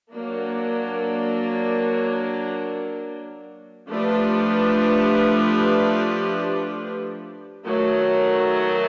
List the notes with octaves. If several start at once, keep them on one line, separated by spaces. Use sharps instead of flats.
F#3 A#3 D4
F3 A3 D4 G4 B4
D#3 F#3 A3